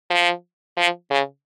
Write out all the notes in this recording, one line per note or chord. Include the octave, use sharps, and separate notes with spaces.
F3
F3
C#3